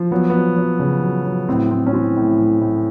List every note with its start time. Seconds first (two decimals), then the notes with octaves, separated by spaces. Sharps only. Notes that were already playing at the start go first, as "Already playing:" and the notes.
Already playing: F3
0.11 F#3 B3
0.30 F#3 B3
0.57 F#3
0.80 C#3
1.02 F#3
1.25 F#3
1.48 A2 C4
1.70 A2 C4
1.86 C#4
1.93 E3 C4
2.17 A2
2.38 A2
2.61 A2